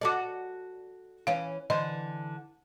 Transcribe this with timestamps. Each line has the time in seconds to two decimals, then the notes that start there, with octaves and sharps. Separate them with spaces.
0.01 F#4 A4 D5 D#5 D6
1.27 E3 C#4 F5
1.70 D3 E3 C5 D#5